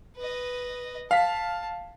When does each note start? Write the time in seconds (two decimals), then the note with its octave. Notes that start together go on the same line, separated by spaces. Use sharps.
0.17 B4 D#5
1.11 F5 A5 B6